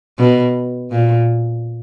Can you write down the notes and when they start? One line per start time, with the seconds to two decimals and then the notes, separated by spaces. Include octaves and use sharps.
0.18 B2
0.91 A#2